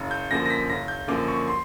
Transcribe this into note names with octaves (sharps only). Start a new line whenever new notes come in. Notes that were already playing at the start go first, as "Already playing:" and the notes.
Already playing: F#1
G6
F#2 D3 F3 A#3 A#6
A#6
B6
F#1 A#6
G6
F#2 D3 F3 A#3 D6
C#6
C6